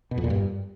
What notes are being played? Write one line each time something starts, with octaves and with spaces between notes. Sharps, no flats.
B2
F2
A#2
G2